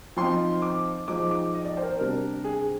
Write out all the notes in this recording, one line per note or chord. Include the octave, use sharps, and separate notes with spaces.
F3 C4 D#4 C6
D6
F3 G#3 D#4 D6
D6
D#5
D5
C5
A#4
C5
C3 G3 D4 A#4
G#4